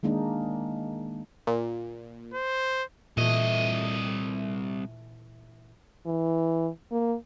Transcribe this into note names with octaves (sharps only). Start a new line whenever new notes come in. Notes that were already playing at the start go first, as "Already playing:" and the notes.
D#3 G#3 A#3 D4 D#4
A#2
C5
C2 A#2 E3 A3 D#5
E3
A#3